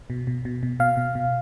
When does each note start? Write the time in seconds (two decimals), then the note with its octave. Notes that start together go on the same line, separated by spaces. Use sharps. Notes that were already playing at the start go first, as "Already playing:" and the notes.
0.10 B2
0.27 B2
0.45 B2
0.63 B2
0.80 B2 F5
0.97 B2
1.15 B2